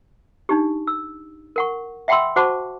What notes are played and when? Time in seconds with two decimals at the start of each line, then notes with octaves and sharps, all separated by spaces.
0.49 D4 D#4 G4
0.87 E6
1.56 A#4 F#5 C#6
2.08 E5 F#5 G5 B5 C6 E6
2.36 F#4 C5 F#5 A5 C#6 D6